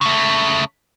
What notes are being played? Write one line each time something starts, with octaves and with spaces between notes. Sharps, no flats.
C#3 A3